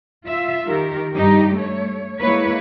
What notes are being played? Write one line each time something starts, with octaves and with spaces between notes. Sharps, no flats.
F4 E5
D#3 G4 A#4
G2 D#4 G4
A3 C#5
G#3 A#3 E4 B4 C#5